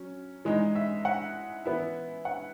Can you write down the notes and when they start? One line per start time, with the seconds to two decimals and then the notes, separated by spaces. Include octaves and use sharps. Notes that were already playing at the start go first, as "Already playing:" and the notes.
Already playing: F#3 C#4
0.45 E3 G#3 D#4
0.75 E5
1.05 F#5
1.65 E3 B3 E4
2.25 F#5